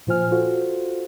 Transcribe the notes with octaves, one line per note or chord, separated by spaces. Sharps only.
A#2 F3 F4 C5 G#5 F6
F4 F#4 A4 C5